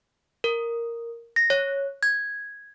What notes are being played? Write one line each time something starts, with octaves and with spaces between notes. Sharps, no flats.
A#4
A#6
C#5
G#6